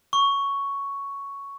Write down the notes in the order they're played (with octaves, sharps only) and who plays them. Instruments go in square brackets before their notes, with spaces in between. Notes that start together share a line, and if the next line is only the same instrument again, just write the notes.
[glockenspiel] C#6